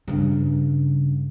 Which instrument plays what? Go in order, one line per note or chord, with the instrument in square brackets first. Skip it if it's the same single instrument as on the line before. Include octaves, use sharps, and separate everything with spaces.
[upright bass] G2 C#3